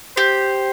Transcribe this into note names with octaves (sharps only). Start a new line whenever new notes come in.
G4 C5